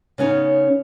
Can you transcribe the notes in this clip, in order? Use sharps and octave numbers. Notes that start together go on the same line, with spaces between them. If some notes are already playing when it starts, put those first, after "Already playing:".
C#3 B3 C#4 D#4